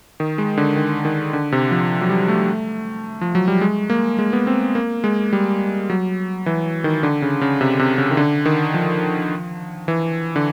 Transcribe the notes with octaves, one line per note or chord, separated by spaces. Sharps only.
D#3
G#3
D3
D#3
D#3
D3
C3
F3
F#3
G3
A3
F3
F#3
G3
G#3
A#3
G#3
B3
C4
A#3
G#3
G3
F#3
E3
D#3
D3
C#3
C#3
C3
C3
C#3
D#3
D3
D#3
F3
E3
D3